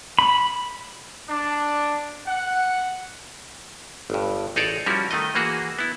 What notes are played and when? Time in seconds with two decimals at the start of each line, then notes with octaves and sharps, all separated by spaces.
0.19 B5
1.29 D4
2.27 F#5
4.10 G1 G2
4.56 A1 D#4 G#4 A4 C#5 D5
4.86 F3 G3 C#4 E4 F#4 A#4
5.11 D#3 A3 D#4 D#5
5.35 E3 A#3 F#4 G#4
5.79 B3 E4